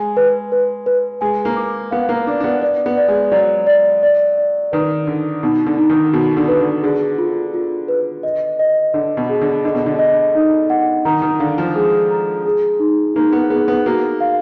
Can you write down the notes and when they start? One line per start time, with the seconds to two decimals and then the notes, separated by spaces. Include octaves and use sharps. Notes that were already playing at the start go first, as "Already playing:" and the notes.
Already playing: G#3 G#5
0.17 B4
0.52 B4
0.86 B4
1.21 G#3 G#5
1.45 A#3
1.57 D6
1.91 B3 F5
2.09 A#3
2.27 D4 D6
2.40 D4
2.44 B3
2.62 D5
2.86 B3
2.97 D5
3.08 G#3
3.32 F#3 D5
3.67 D5
4.03 D5
4.38 D5
4.72 D#3 B4
5.07 D3 D#4
5.43 B2 D#4
5.66 D3
5.77 D#4
5.90 D#3
6.13 B2 F#4
6.37 D3
6.48 B4
6.60 D3
6.83 D3 G#4
7.18 F4
7.54 F4
7.88 B4
8.23 D#5
8.59 D#5
8.94 D3 D#5
9.17 B2
9.29 G#4
9.41 D3
9.64 D3 D#5
9.75 B2
9.86 D3
9.99 D#5
10.35 D#4
10.70 F#5
11.05 D#3 A#5
11.22 D#3
11.40 D3 F5
11.58 F3
11.75 G#3 G#4
12.11 A#5
12.46 G#4
12.80 D#4
13.15 A#3 D#4
13.33 B3
13.50 B3 G#4
13.68 B3
13.86 A#3 F#4
14.21 F5